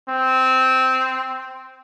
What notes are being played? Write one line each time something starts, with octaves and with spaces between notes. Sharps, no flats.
C4